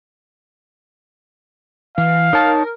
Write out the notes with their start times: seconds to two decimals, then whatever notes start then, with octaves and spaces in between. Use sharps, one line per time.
1.98 E3 F5
2.33 D#4 A#4 C#5 A5